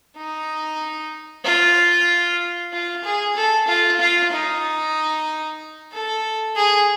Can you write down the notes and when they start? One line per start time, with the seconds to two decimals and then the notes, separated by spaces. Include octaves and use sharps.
0.17 D#4
1.45 F4
2.73 F4
3.04 G#4
3.36 A4
3.68 F4
4.00 F4
4.32 D#4
5.92 A4
6.56 G#4